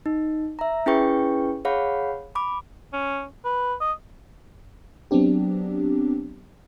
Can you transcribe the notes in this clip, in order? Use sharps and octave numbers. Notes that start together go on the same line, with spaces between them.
D#4
E5 A#5
C#4 E4 G#4 B4 G5 C#6
G#4 C#5 F5 F#5 B5
B5 D6
C#4
B4
D#5
F#3 B3 C4 D4 G4